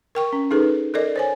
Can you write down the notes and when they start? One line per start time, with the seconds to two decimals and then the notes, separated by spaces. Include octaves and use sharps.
0.15 A#4 G5 C#6
0.33 C#4
0.51 D#4 G#4 A4 B4
0.94 A4 A#4 D5 D#5
1.16 C5 C#5 G#5